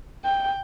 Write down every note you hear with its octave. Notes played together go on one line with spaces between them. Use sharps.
G5